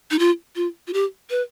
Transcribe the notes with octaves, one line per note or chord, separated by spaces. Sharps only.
D#4
F4
F4
F4
G4
B4